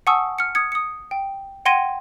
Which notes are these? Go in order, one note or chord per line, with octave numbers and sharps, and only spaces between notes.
F#5 G#5 A5 C#6 D#6 E6
F6 C#7
D#6 G#6 C#7
D#6 C#7
G5
F#5 G5 C6 G#6 A#6 D#7